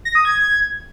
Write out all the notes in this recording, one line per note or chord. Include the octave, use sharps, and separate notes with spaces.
A#6
D#6
G#6